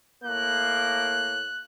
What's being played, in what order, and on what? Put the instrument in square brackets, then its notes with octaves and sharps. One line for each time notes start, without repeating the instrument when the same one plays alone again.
[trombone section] A2 A#3 [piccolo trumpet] F#6